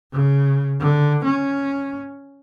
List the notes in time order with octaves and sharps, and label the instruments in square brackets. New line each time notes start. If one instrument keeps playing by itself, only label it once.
[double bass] C#3
D3
C#4